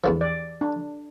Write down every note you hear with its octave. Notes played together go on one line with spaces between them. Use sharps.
E2 D3 F3
D5
D4